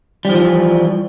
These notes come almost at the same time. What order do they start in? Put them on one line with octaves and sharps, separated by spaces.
G3 F3 E3